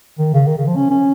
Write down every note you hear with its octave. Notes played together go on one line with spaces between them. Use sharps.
D#3
C#3
D#3
C#3
F3
C#4
C#4